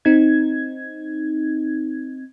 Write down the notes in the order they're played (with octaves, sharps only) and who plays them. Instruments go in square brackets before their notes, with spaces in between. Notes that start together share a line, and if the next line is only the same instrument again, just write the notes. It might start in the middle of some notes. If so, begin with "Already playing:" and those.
[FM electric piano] C4 D#4 G#6